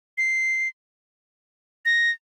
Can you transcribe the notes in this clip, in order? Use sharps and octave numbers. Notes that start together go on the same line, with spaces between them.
C7
A#6